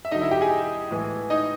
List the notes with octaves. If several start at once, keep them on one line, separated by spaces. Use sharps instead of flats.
E5
D3 F#3 D#4 D#5
E4 E5
G4 G5
G#4 G#5
A2 E3 G#3
D#4 D#5